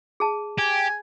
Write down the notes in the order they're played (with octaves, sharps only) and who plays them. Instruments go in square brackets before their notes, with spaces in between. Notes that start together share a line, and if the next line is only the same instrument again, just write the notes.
[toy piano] G#4 A5
[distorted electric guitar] G4 [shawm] G#5